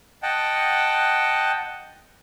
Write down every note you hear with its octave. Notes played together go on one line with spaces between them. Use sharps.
D#5 F#5 G5 A5